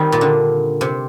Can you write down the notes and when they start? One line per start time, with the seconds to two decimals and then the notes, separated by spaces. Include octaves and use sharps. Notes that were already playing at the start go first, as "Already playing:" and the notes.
Already playing: D#3 G3 C4 D#4
0.12 A#2
0.21 D3
0.81 C3